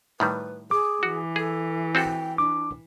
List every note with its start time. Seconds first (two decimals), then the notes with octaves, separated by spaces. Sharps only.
0.20 A2 D#3 G3 B4
0.71 G#4 D6
1.03 E3 F#4
1.36 G#4 A4
1.95 C4 F#4 A4 G5
2.38 D4 D6